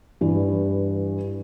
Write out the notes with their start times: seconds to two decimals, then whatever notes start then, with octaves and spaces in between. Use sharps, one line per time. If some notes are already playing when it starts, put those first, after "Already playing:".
0.21 G2 E3